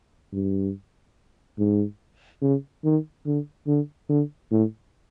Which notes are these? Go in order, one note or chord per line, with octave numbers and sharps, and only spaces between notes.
G2
G#2
C#3
D#3
D3
D3
D3
A2